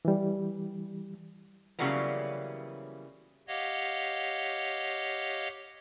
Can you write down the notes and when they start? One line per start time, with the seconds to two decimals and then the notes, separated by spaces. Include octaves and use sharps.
0.05 E3 G3
1.79 C#3 E3 F#3 G3 A#3 B3
3.48 G4 C#5 D#5 F5 F#5